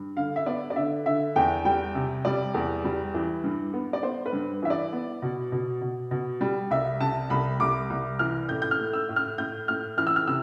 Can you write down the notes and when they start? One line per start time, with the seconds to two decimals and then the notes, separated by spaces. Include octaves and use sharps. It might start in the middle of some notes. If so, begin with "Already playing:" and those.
Already playing: G2
0.17 D3 F5
0.36 E5
0.46 B3 D5
0.70 D5
0.76 D3 E5
1.06 D3 E5
1.36 E2 G5
1.65 G3 G5
1.95 C3
2.25 G3 D5
2.54 E2
2.84 G3
3.14 E3
3.44 G2
3.73 B3
3.93 D5
4.03 B3 C5
4.26 B4
4.33 G2
4.62 E3 E5
4.70 D5
4.92 B3
5.22 B2
5.52 B2
5.81 B2
6.11 B2
6.41 G3
6.71 C2 E5
7.01 C3 A5
7.30 C2 B5
7.60 C2 D6
7.90 C2
8.19 E3 F6
8.49 A2 G6
8.62 G6
8.71 F6
8.79 A3
8.93 E6
9.09 A2
9.16 F6
9.38 A2 G6
9.68 A2 F6
9.97 E3 F6
10.07 E6
10.16 F6
10.27 C3 E6